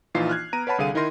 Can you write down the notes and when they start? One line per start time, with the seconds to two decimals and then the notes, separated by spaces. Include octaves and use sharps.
0.15 A#1 E3 D#4 F4 C7
0.29 F6 F#6 G#6
0.53 B3 A#5 D7 D#7
0.67 B4 C#5 F#5 A5 B5
0.78 C2 D3 G#4 F5 D#7
0.94 D#3 D#4 E4 A#4 C6 A#6